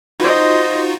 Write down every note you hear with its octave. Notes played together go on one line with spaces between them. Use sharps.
D#4 F4 F#4 C5 D#5